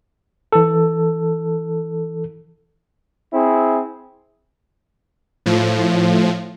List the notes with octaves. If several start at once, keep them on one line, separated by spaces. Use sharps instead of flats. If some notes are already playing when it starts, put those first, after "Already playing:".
E3 A4
C4 E4 G#4
A2 F3